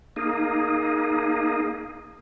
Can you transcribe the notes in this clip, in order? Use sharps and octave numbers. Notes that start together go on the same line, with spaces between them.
A#3 D#4 G#4